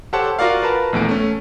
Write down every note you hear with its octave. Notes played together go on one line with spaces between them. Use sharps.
G4 A4 C5 C#5 F#5 A5
F4 F#4 A#4 D5 F5
A#4 B4 A5
A#1 E2 A3 D7
A3 C#4